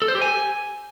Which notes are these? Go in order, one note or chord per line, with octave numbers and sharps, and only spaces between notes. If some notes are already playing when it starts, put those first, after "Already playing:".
A4
C5
G4
G#5